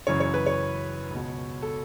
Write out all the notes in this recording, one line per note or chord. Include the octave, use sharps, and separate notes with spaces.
F#2 C#3 E3 C#5
C#5
B4
C#5
C#2 B2
A4